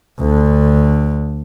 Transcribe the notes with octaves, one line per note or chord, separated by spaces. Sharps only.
D2 D3